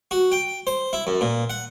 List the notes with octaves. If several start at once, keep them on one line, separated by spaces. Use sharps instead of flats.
F#4
G5
C5
E4
F#2
A#2
F#5